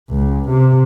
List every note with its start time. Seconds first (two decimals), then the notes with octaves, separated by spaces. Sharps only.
0.11 C#2
0.50 C3